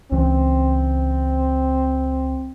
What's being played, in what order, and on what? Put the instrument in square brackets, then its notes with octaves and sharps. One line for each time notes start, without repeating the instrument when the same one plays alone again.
[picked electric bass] C#2 E3 [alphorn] C4